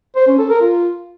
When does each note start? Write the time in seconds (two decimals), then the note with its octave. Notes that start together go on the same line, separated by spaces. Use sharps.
0.16 C5
0.27 C#4
0.39 A4
0.50 A#4
0.61 F4